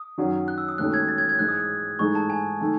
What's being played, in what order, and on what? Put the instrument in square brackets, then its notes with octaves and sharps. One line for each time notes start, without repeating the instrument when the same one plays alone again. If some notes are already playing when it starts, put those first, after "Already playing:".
Already playing: [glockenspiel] D#6
[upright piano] F#2 D#3 F#3 C#4
[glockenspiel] F#6
E6
D#6
[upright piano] E1 D#2 D#3 A3 C#4 [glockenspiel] F#6
[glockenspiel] G#6
A6
G#6
G#6
[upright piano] G#2 E3 G#3 [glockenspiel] F#6
[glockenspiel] D#6
D#6
[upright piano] G#2 E3 A3 D#4 G#4 [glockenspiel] C#6
[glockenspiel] A5
G#5
[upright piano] D#3 A3